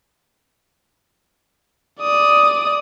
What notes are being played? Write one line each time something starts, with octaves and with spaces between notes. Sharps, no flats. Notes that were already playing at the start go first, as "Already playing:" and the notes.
D5 D#6